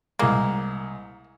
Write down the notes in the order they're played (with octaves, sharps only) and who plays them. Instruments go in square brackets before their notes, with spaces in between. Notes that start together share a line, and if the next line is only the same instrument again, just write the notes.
[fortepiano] C2 G#3 [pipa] A#3